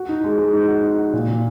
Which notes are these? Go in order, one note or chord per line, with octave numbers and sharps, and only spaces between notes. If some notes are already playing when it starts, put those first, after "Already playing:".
Already playing: F#4
D#4
G#3
G#3
D#4
F#4
D#4
F#4
A#2
A#2